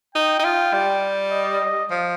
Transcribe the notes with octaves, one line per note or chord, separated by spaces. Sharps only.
D#4 G5
D#4
F4
G3
D#5
F3